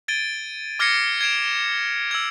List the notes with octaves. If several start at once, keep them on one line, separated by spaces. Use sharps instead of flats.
G#6 A6 D7 D#7 G7
D6 F6 G#6 A#6 C7 C#7
G#6 C7 D7 E7 F7
E6 G#6